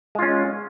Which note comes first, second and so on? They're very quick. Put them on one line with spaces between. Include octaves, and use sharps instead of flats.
G#3 F4 C#4